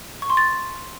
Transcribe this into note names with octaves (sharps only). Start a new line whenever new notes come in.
C#6
C6
A6